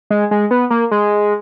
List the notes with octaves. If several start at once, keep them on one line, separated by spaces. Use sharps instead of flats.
G#3
G#3
B3
A#3
G#3